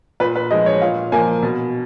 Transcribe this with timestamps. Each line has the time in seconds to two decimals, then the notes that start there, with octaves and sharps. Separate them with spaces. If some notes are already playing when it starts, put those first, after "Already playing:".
0.20 A#2 B4
0.35 B4
0.50 F3 G#3 D#5
0.66 C#5
0.81 A#2 F5
1.12 F3 A#3 G#5
1.43 B2